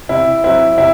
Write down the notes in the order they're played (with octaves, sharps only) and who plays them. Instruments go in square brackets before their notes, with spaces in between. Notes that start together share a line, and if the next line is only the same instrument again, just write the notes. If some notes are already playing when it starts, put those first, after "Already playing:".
[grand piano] C3 E4
F#3 C4 E4
C3 E4